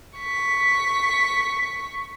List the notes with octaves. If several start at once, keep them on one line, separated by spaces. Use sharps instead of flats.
C#6 B6